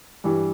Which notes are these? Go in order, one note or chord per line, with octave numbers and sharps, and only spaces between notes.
G2 E3 G3